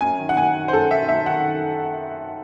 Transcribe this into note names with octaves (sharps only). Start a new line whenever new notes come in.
F#2 G#5
D#3
F#5
F#2 G#5
D#3
C5
F#2 A4
D#3 E5
F#2 E5
D#3 F#5